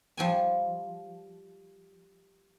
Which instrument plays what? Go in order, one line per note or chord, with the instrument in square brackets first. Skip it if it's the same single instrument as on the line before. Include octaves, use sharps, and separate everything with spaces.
[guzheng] F3 G3 G#5